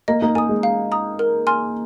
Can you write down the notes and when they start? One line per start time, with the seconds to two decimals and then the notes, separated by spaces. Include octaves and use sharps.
0.08 A#3 D#5
0.22 A#3 D#4
0.35 A#3 G#5 D#6
0.49 G#3
0.63 F5
0.92 A#5 D#6
1.19 A#4
1.47 G#5 C6 F6